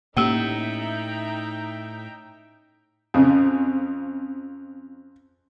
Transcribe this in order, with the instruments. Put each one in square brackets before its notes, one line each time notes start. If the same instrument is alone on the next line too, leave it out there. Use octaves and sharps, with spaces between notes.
[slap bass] A2 [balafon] A#3 G4 [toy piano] C#4 E6 [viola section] D#4 E5 G5
[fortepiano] F2 C#3